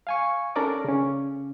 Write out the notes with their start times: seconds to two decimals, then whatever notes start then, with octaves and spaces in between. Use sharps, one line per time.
0.07 F5 G#5 C#6
0.56 C#4 D4 A4 A#4 D5 D6
0.85 C#3 C#4